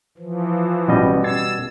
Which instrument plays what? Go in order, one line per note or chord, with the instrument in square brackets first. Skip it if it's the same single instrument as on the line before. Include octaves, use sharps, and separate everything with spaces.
[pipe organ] E3 F3
[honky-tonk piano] A1 F4 [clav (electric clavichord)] B2 G3 D#5
[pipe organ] E6 [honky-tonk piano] G#6 A6 C7